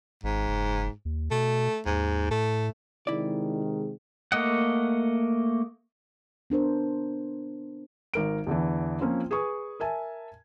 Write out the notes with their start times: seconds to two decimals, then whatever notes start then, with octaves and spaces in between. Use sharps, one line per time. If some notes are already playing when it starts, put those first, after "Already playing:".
0.23 G#1 G#2
0.48 F#1
1.05 D#2
1.31 B2 A3
1.86 D#2 G#2
2.31 A2 A3
3.07 C3 D#3 G#3 E4 D5
4.32 A3 A#3 D#5 F#5
6.50 B3 D4 A#4 C5
8.14 G#1 A#4 D7
8.47 E2 D3 E3
9.01 F3 A#3 C4 C#4 F4
9.31 G#4 B4 G#5 C#6 D#6
9.80 A#4 E5 G#5 A5